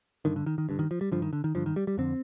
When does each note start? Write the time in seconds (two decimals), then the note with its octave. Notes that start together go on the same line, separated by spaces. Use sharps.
0.25 G2 D3 D#3
0.36 D3
0.46 D#3
0.58 D#3
0.69 G2 D3
0.79 D#3
0.91 F3
1.01 G3
1.12 G2 D3 F3
1.22 D#3
1.33 D3
1.44 D#3
1.55 G2 D3 F3
1.66 D#3
1.76 G3
1.87 G3
1.97 F2 D3 C4